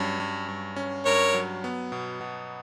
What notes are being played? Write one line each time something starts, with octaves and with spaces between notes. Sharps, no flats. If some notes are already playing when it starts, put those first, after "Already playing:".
Already playing: G2 F#3 C#4
G2
G2
C#4
G2 A#4 C#5
F#3
B3
B2
B2